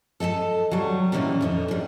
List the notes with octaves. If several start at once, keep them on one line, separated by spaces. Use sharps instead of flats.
A4 D#5 G#5 A5
F#3 G3
A#2 D#3 E3 A#3 C#4 D4
F2 D3 D#4
D#2 G3